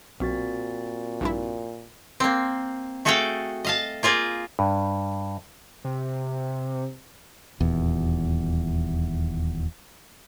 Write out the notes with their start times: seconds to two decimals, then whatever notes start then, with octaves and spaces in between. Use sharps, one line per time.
0.20 B1 A#2 C4 F#4 A6
1.21 A#1 G2 E4
2.20 A#3 C4
3.05 A3 F#4 G#4 A4 F5 G5
3.65 D#5 F5 A5
4.03 A#3 F4 G#4 A#4
4.59 G2
5.84 C3
7.60 D#1 E2